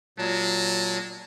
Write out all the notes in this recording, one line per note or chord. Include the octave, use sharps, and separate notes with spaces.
A#2 F#3 G#3 A5